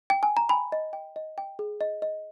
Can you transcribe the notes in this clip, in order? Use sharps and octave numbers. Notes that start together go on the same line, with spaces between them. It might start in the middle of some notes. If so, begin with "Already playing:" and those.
G5
G#5
A#5
G5 G#5 B5
D#5
G5
D#5
G5
G#4
D#5
D#5